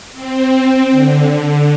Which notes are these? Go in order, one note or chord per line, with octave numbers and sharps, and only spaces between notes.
C4
D3